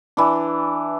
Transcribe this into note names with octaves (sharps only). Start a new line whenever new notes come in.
E3 D4